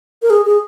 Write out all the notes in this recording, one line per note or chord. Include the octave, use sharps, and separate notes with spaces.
A#4
G#4
G#4